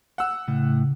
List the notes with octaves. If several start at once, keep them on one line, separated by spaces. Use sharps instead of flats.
F#5 E6
A2 C#3